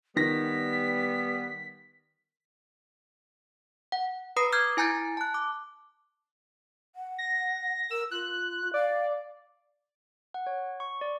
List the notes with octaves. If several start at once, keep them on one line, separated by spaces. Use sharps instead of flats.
D#3 G3 B3 A#6 B6
F#5
B4 A#5 B5 D#6 A#6 C7
D6 F6 G6 G#6 C7
E4 G#5 A#5 G6 A6 D7
A5 F#6
D6
F#5
A#6
A#4 E6
F4 F#6
D5 F5
F#5
C#5
C#6
D5